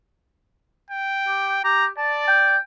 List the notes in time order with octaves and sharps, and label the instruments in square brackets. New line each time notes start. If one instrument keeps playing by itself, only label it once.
[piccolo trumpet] G5
[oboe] G4
[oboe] G4 [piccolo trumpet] A#5
[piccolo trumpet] D5 [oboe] A5
[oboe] G5